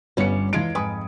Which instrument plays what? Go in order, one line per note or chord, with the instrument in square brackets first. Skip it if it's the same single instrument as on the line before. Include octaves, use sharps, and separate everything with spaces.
[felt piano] G1 C#7 [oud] G3 B3 C#4
[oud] E2 G#3 F4 [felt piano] E3 G#6 D7
[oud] F2 G#2 B4 [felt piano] G#5 D#6